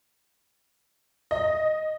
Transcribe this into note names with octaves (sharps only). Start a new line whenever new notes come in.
D#5